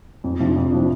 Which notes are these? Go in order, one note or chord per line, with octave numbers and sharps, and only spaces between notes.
F2
C3 F3 D4
F2
C3 F3 D4